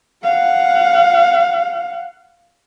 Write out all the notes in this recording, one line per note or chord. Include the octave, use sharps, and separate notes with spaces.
F5 F#5